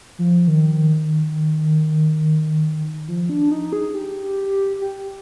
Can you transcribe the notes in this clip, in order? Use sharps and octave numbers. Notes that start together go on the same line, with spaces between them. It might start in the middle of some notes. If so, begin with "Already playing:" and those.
F3
D#3
F3
D4
D#4
G#4
G4
G4